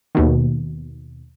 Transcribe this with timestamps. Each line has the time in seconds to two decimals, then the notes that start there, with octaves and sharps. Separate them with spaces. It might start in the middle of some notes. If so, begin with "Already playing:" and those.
0.15 D#2 B2 D#3